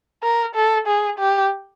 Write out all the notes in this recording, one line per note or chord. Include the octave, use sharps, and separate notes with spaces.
A#4
A4
G#4
G4